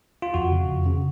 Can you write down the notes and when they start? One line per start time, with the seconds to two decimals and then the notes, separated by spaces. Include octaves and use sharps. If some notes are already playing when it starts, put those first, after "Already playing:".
0.22 F4
0.34 F2 F#4
0.52 C#3
0.68 F2
0.86 C#3